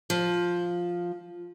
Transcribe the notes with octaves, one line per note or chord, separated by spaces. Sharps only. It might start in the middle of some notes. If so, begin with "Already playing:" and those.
F3